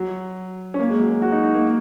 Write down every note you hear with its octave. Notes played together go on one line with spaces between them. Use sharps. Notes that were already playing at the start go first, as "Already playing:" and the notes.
Already playing: F#3
C#4
A#3
G#3
F#3
G#3
F#4
D#4
D#4
A#3